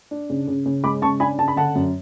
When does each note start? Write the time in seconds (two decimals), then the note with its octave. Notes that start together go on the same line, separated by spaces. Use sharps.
0.11 D4
0.30 C#3
0.47 C#3
0.66 C#3
0.84 G#3 B5 D6
1.02 C#3 A5 C#6
1.20 D4 G#5 B5
1.38 C#3 A5
1.48 B5
1.56 D3 F#5 A5
1.75 F#2